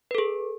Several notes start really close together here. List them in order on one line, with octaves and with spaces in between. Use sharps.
B4 A4 G#4